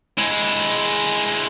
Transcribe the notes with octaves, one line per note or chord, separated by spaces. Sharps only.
G#3 E4